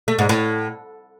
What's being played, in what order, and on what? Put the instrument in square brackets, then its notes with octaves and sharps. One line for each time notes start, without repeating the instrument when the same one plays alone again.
[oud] A3
G#2
A2